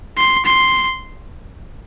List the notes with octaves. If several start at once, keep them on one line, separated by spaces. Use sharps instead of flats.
C6
C6